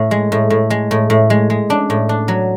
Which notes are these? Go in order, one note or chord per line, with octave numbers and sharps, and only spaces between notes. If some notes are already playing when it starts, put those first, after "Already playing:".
Already playing: A2
G#3
A2
A2
G#3
A2
A2
G#3
G#3
D4
A2
D4
F#3